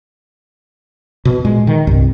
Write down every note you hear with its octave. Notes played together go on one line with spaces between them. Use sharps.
B2
A#2 G#3
D#3
C2 G2